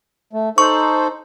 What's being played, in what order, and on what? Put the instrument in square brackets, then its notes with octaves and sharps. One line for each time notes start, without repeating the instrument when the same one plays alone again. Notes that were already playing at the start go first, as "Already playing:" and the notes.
[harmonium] A3
[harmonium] D#4 A4 C5 [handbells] C#6